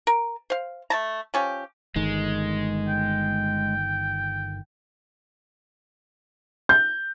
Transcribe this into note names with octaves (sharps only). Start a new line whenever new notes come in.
A#4
C5 F5
A3 A5 A#5
F3 C#4 G4
G1 D#3 G#3
G5
G6